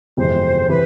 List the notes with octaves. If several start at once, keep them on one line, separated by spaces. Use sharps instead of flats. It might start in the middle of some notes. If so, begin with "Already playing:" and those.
G1 F2 C3 E3 G#3 C5
C3 E3 B4